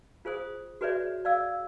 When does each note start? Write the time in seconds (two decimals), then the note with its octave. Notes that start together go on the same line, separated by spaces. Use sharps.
0.25 F4 G#4 C5 D#6
0.81 F#4 G#4 B4 C#5 D5 E5
1.25 D5 F5 E6